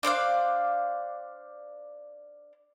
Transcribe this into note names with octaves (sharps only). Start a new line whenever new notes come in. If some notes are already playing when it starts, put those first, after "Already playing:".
D4 C5 D5 F5